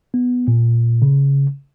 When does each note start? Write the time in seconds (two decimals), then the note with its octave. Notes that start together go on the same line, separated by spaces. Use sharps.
0.14 B3
0.48 A#2
1.02 C#3